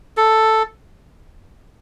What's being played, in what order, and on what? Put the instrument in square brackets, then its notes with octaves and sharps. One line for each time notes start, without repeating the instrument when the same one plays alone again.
[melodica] A4